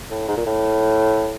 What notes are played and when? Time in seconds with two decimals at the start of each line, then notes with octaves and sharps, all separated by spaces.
0.10 A2
0.28 G#2
0.37 A#2
0.46 A2